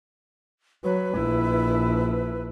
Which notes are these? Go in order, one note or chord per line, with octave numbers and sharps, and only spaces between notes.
F#3 B4
A#1 E4